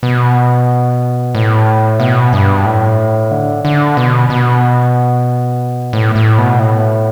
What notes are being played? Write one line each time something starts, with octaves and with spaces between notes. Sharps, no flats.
B2
A2
B2
G2
A2
D3
D3
B2
B2
A2
A2
B2
A2